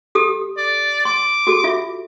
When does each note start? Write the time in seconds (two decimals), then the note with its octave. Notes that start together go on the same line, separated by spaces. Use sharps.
0.15 G4 A4 D#6
0.57 D5
1.05 C6 D6
1.47 F#4 G4 A4
1.64 F4 E5